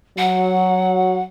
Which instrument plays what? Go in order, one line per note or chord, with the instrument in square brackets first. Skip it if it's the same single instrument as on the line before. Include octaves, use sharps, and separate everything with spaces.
[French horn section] F#3 [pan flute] F#5